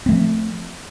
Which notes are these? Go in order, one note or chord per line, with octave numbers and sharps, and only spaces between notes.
F3 A3 C4